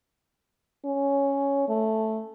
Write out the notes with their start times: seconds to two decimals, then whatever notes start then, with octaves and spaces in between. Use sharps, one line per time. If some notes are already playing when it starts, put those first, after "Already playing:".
0.85 C#4
1.69 A3